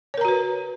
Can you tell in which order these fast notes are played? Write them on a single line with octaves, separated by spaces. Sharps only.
C#5 A#4 A#5 F#4 B4